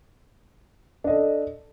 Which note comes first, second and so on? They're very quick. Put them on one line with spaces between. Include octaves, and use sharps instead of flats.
D4 D#5 A4